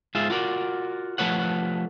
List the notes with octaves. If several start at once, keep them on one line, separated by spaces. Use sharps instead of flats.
G#2 F4 G#4 E5
F4 F#4 A#4 D5
F3 A3 B4 C#5 F#5